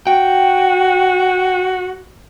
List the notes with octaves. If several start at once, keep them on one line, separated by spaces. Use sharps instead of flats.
F#4 G5